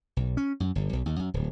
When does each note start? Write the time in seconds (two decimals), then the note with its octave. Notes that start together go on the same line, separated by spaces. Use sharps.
0.17 B1
0.37 C#4
0.60 F#2
0.75 G1
0.93 B1
1.06 D#2
1.19 F#2
1.34 D1